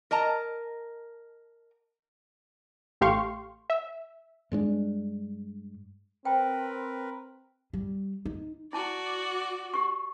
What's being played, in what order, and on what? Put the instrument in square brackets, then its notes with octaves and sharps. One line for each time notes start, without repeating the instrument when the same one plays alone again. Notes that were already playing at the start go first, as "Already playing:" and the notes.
[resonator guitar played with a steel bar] A#4 D#5 A5 A#5
[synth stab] A1 A3 G4 F5 C6 C#6
E5
[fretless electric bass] G2 G#3 C#4 D4
[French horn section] C4 [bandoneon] A#4 B4 [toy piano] G5
[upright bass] G3
D#4
[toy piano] E4 A5 D6 [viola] F#4 D5
[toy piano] G4 C#6